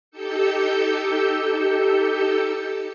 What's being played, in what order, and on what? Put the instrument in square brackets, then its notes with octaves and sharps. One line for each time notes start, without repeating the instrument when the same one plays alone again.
[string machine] D#4 G4 A4 E6 G6 C#7